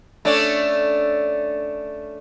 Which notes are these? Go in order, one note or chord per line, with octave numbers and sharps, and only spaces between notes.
A3 C#4 D4